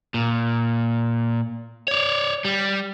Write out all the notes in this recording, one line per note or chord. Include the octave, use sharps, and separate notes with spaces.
A#2
C#5 D5
G3